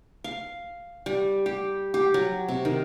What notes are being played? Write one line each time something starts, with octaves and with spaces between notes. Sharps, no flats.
F5
G3
G4
G4
F#3
C3
D#3